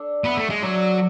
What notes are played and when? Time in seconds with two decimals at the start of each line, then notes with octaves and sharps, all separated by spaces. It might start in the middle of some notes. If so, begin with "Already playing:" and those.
Already playing: D4 A4
0.24 B3 E5
0.37 A3
0.50 G#3
0.62 F#3 D4